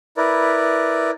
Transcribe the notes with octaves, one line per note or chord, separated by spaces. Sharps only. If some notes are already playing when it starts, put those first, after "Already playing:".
E4 A#4 B4 D5